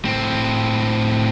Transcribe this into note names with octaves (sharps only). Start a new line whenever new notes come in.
A2 C4